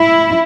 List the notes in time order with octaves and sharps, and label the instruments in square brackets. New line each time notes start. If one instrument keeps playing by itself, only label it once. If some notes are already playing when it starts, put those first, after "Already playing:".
Already playing: [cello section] E4